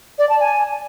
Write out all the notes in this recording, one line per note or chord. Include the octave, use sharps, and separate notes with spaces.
D5
A5
G#5